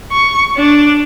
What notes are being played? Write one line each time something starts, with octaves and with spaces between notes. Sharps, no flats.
C#6
D4